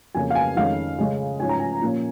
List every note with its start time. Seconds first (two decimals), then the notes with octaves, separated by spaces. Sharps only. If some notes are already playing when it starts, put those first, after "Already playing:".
0.15 F2 C#3 A#3 C#4 G#5
0.30 F5
0.35 G#5
0.56 F2 D#3 G#3 C#4 F5
0.98 C#3 G#3 C#4
1.39 G#2 F3 C#4 G#5
1.49 A#5
1.59 G#5
1.82 A#2 F3 A#3 C#4